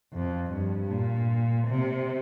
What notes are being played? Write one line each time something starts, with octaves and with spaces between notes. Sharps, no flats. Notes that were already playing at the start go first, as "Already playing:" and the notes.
F2
G2
A#2
C3